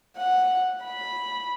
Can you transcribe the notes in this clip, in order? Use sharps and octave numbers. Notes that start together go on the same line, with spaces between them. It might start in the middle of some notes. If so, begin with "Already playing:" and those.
F#5
B5